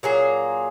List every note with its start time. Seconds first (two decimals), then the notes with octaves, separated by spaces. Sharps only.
0.03 A#2 F#3 A#3 G#4